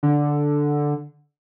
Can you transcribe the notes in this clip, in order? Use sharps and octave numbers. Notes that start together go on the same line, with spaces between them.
D3